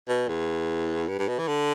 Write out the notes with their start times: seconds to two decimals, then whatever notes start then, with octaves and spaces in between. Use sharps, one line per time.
0.09 B2
0.28 E2
1.08 G2
1.19 G2
1.28 B2
1.39 E3
1.48 D3